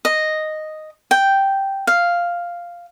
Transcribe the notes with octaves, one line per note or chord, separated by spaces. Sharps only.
D#5
G5
F5